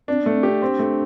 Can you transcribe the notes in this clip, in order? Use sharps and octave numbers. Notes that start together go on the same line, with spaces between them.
C4 D4
A3 B3
C4
G4
D4
C4
A3